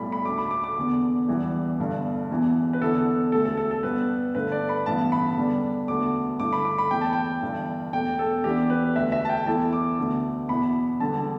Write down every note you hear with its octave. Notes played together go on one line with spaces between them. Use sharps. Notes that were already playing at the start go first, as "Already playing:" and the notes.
Already playing: B1 A2 G3 E4 B5
B5
D2 D3 A3 D6
B5
D6
D6
E2 D3 B3
E1 E2 E3 G3 B3
G1 G2 D3
E1 E2 E3 B3
B4
E2 D3 B3 E4 A4
A4
E1 D2 D3 A3 A4
A4
A4
A4
G2 G3 B3 B4
G1 G2 D3 A3 B4
D5
B5
A1 G2 E3 B3 A5
B5
E2 D3 G3 D4
E1 D2 D3 B3 D6
G2 D3 A3 E4 D6
B5
D6
B5
E2 E3 A3 E4 G5
A5
G5
G1 G2 E3
E1 E2 B2 A3 G5
A4
E2 E3 B3 D4 G4
B4
E1 D2 D3 E5
E5
A5
G5
E2 E3 A3 E4 A5
D6
D2 D3 B3
E2 B2 B3 E4 B5
E1 E2 D3 G3 B3 A5